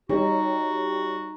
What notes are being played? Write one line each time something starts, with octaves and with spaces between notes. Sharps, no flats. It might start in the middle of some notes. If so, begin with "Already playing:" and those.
G3 D#4 F#4 C#5